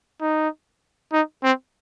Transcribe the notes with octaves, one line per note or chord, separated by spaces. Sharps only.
D#4
D#4
C4